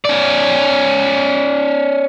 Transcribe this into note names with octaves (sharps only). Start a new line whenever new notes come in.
C#4 D5